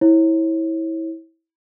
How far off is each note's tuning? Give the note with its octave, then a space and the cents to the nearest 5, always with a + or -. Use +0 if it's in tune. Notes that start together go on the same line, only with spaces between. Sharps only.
E4 -15 C#5 -35